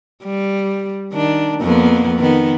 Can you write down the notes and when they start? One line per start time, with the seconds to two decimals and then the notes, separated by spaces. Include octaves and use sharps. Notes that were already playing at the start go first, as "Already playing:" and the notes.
0.24 G3
1.13 D#3 D4
1.61 F2 A#3 B3
2.19 D#3 B3